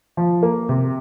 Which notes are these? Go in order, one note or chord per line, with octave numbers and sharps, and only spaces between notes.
F3
A#3
C3